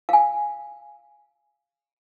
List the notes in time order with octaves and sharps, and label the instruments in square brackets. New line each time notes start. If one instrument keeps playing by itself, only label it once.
[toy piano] F5 G#5